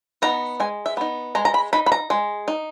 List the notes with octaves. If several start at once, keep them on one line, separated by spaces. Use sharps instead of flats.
B3 D#4 A#5
G#3 G#5
E5
B3 D#4
G#3 A#5
A#5
B5
D#4 B5
B5
A#5
G#3
D#4